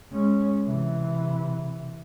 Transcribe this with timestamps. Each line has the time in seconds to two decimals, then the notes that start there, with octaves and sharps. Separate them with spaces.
0.11 G#3 C#4
0.65 C3 E3